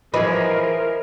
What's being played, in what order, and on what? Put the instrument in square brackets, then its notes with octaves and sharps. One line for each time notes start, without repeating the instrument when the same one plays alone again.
[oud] E3 B4 [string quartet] F3 [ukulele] G#4 D#5 [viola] A#4